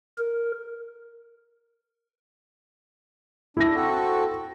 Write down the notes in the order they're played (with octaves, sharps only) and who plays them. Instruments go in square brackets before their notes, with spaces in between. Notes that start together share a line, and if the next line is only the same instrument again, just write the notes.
[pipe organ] A#4
[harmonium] D4 [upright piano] E4 A#6
[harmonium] C4 F#4 A4